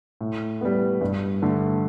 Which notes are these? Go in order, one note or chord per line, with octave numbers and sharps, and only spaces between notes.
A2
G3 B3
G2
D3 A3